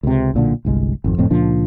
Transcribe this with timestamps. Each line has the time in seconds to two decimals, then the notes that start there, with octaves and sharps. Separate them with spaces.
0.03 C#2 C3
0.34 B1 A#2 D3
0.65 G1 C2 G#3
1.04 G#1 F2
1.18 F#1 F2 A2 C4
1.31 C#2 A#2 F3 D4